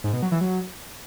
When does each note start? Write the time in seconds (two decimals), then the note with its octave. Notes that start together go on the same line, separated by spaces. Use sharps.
0.04 G#2
0.13 B2
0.22 F#3
0.32 E3
0.41 F#3